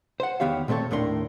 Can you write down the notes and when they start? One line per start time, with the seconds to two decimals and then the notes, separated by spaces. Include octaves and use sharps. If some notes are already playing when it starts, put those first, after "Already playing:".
0.20 C5 F#5
0.40 E2 D#3 B3 G4 C#5 F5
0.68 A#2 A3 C4 A4 C#5
0.91 D#2 A2 A3 D4 A#4 C6